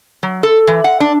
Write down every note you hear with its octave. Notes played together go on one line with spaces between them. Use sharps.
F#3
A4
E3
F#5
D4